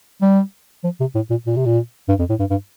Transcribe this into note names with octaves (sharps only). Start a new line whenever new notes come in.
G3
F3
C3
A2
A#2
A#2
C3
A#2
G2
F2
A2
G2
G2